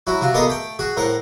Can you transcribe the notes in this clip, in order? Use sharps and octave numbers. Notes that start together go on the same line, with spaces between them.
F#3 E4 F#4
C3 F4 F#4
A#3 B3 G#4 A4 D#5 D#6
A3 G5
F#4 G#4
A2 A#4 C5 F#5